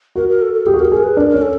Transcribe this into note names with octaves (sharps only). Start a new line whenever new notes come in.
F#4 A#4
A#4
A4
A4
G4 G#4
F#4
G4 A#4
G#4 A#4
B4
D4 A#4
C#4 A#4
A4